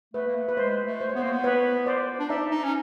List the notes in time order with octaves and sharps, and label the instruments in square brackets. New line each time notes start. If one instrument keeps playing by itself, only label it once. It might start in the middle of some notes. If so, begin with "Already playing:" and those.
[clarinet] A3 [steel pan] B4
[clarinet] A#3
A3
[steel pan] B4
[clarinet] G#3 [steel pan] C5
[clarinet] A3
[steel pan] C5
C#5
[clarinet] B3
[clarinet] A#3 [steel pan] C5
[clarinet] B3
[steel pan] B4 C#5
C5 D5
[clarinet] D4
[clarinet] D#4 [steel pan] D5 E5
[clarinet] D#4
C#4